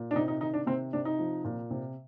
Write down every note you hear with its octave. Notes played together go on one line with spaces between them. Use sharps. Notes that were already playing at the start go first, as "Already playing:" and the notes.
Already playing: A#2
D4
C3 D#4
D#4
D#3 D#4
D4
C3 C4
C3 D4
D#4
F3
A#2
C3